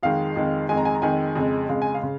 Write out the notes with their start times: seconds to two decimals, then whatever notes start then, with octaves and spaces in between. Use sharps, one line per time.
0.03 F2 D#3 G#3 F5
0.36 F2 D#3 G#3
0.69 F2 D#3 G#3 G#5
0.77 A#5
0.85 G#5
0.94 A#5
1.02 F2 D#3 G#3 G#5
1.36 F2 C#3 G#3
1.68 F2 C#3 G#3 F5
1.82 G#5
1.94 F5
2.03 C#3